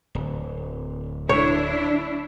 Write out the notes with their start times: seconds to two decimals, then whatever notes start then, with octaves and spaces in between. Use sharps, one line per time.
0.15 D1
1.29 D4 E4 C#5